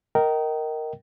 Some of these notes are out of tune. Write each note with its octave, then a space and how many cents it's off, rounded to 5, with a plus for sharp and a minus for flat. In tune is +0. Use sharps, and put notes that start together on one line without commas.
A#4 +0 D#5 +10 G5 -30